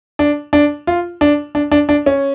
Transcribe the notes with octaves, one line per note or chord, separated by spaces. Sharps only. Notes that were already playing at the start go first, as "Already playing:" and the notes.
D4
D4
F4
D4
D4
D4
D4
C#4